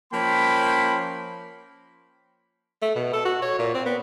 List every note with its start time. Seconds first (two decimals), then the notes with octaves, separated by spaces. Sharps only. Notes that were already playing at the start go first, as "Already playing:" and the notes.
0.13 F3 A#3 C#4 G5 B5 C6
2.82 A3
2.95 B2
3.13 A4
3.25 F#4
3.42 C#5
3.59 A#2
3.74 C4
3.86 B3